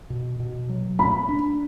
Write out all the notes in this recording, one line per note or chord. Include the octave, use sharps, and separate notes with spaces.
B2
B2
F#3
A3 B5
D4